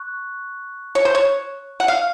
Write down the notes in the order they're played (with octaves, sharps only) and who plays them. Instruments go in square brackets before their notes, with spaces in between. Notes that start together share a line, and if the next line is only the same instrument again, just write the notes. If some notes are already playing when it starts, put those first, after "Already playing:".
Already playing: [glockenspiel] C#6 F#6
[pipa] C#5
C5
C#5
F#5
F5